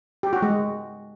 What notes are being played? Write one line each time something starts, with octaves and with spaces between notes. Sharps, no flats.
G4
F#4
G#3